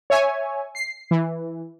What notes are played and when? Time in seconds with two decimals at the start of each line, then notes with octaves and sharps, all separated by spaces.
0.10 C#5 E5 G#5
0.75 C7
1.11 E3